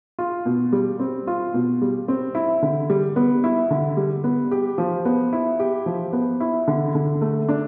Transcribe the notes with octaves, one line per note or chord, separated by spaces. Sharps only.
F4
B2
G3
C4
F4
B2
G3
C4
E4
D3
G3
B3
E4
D3
G3
B3
G4
F3
B3
E4
G4
F3
B3
E4
D3
D3
A3
D4